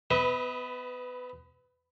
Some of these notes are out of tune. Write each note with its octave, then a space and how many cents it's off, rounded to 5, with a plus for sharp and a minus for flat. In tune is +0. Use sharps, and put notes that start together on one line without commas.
B3 +20 B4 +0 E5 -45